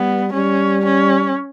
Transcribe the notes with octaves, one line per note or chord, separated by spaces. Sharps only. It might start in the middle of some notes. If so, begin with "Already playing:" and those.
Already playing: G3 B3
G3 C#4
C#4